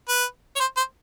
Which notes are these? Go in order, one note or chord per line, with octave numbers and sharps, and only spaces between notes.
B4
C#5
C5
C5